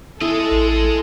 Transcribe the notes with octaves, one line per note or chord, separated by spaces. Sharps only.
G#3 E4 A4 D#5
A1